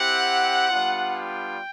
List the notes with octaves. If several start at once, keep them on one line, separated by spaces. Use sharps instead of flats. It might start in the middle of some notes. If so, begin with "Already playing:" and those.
Already playing: C4 E4 G4 F#5
G3 B3 D4 F4
G5